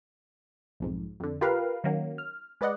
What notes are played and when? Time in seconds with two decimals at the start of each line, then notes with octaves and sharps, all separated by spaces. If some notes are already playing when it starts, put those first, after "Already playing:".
0.80 B1 F2 G#2
1.20 F2 D3
1.41 F4 G4 A#4 B4 F5
1.84 D#3 F#3 A#3 C#4
2.18 F6
2.61 G#3 B4 D5 D#5 F#5